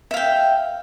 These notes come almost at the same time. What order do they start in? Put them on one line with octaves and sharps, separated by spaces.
E5 F5 G5